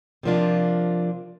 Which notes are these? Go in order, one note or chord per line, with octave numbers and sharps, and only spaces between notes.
C3 F3 A#3 D4 F4